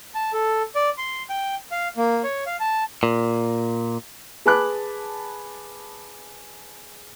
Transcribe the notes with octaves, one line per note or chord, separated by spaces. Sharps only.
A5
A4
D5
C6
G5
F5
A#3
C#5
F5
A5
A#2
G#4 B4 A5 B5 D6 F#6